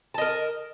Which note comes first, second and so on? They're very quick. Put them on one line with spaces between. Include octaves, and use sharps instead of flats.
A5 D#5 A#4